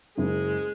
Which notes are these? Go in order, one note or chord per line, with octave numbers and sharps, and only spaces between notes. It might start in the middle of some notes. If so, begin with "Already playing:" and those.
F#1 G#3